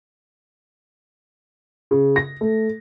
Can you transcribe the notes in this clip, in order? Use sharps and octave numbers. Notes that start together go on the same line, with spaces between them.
C#3
A#6
A3